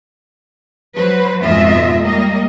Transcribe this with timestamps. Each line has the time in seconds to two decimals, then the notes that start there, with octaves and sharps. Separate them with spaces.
0.94 F#3 B4 C5
1.41 F2 G#2 B2 F4 D#5 E5
2.01 G3 A#3 D#5